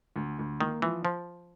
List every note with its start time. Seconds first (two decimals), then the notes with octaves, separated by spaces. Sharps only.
0.16 D2
0.39 D2
0.61 D#3 A#3
0.82 E3 F3
1.05 F3